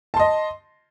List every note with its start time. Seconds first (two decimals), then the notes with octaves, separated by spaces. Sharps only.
0.14 A5
0.17 C6
0.20 D#5